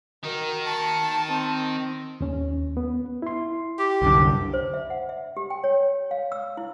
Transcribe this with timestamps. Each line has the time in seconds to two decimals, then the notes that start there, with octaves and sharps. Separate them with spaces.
0.24 D#3 D#4 F#4 A#4
0.65 A5 C#6
1.29 C4
2.21 D#2 C#4
2.77 B3
3.22 E4 C6
3.79 G4
4.02 C2 F#2 D3
4.53 C5
4.74 E5
4.90 F#5
5.09 E5
5.37 G4
5.50 G5
5.64 C#5
6.11 F5
6.32 E6
6.57 E4